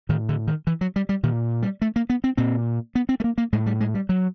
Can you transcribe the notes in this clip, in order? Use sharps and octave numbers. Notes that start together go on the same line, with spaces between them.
A2 D#3
D3
D#3
E3
F#3
G3
G3
A#2 D#3
G3
A3
A#3
B3
C4
A#2 C4
B3
C4
A3
A#3
A#3
A2 G#3
G3
G#3
G3
F#3